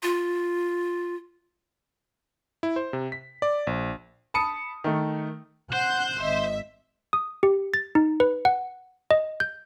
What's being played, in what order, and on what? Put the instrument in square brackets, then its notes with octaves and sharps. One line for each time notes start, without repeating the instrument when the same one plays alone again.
[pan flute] F4
[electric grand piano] E4
C5
C3
B6
D5
A#1
[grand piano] A5 B5 D#6 C#7
D#3 A3
[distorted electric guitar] C5 [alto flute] F#5 [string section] F#6 G6
[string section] G#1 E5 [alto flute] D#5
[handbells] D#6
G4
A6
D#4
B4
F#5
D#5
G6